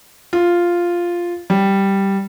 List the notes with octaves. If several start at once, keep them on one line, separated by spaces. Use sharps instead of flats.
F4
G3